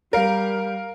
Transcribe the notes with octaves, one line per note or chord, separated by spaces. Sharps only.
G3 A#4 F5